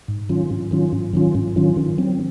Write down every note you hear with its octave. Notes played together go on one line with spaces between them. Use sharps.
G#2
D#3 F#3 C#4 F4
G#2
D#3 F#3 C#4 F4
G#2
D#3 F#3 C#4 F4
G#2
D#3 F#3 C#4 F4
D#3
F#3 C4